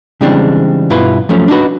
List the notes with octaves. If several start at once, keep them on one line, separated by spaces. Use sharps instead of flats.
C#3 E3 G3 G#3 C4 D4
G2 B2 E4 F4 B4
F3 F#3 A3 C#4
D4 D#4 F#4 B4